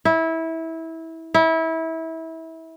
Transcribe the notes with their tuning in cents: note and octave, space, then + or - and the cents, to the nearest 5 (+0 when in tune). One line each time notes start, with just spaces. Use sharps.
E4 -20
E4 -25